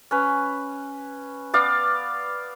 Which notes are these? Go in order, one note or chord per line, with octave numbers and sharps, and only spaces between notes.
C#4 B4
B3 D5 F5